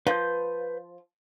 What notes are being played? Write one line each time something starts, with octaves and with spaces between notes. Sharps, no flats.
F3 B4 G6